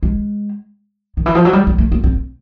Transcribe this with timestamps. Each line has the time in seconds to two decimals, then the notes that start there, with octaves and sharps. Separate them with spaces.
0.03 G#3
1.17 D#3
1.26 E3
1.35 F3
1.45 F#3
1.53 G3
1.67 G#3
1.78 A3
1.92 A#3
2.04 C4